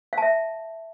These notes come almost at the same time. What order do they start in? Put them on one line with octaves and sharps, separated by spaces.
F5 A5 E5